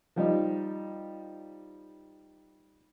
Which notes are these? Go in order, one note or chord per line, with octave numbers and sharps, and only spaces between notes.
F3 G3 D#4